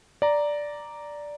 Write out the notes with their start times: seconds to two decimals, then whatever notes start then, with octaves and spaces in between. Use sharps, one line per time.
0.22 D5 A#5